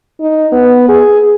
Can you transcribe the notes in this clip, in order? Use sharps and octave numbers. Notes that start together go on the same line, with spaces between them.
D#4
B3
G#4